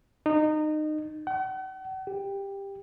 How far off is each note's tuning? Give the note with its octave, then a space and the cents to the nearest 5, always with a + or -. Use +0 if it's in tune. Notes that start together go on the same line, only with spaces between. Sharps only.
D#4 -25
F#5 +45
G4 +15